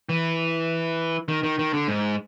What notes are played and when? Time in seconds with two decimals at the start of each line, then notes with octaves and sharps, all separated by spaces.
0.09 E3
1.28 D#3
1.43 D#3
1.59 D#3
1.73 D3
1.88 G#2